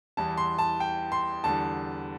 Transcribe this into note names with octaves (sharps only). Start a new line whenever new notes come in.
E2 E3 G3 A5
C6
A5
G5
C6
E2 D3 G3 A5